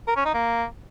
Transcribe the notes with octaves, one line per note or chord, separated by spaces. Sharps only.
A#4
C#4
D#4
A#3